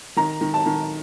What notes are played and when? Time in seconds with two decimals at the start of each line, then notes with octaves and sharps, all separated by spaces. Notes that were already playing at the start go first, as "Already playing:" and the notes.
0.17 D#3 A#5
0.41 D#3
0.54 A5
0.66 D#3